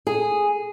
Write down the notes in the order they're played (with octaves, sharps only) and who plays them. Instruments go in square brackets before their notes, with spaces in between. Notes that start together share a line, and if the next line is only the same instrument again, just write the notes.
[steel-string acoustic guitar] G#4